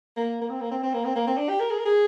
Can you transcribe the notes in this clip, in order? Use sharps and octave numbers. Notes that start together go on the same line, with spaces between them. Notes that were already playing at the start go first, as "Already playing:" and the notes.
A#3
A#3
C4
A#3
C4
C4
A#3
C4
A#3
C4
D4
G4
A#4
G#4
A#4
G#4